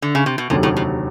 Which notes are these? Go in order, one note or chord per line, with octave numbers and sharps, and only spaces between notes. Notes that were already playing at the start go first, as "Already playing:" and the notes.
D3
C#3
C3
B2
F1 D#2 A#2 D3 F#3
A2
A2